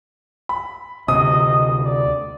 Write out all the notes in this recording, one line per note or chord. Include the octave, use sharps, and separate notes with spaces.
B5
D2 C3 D#5 D#6
D5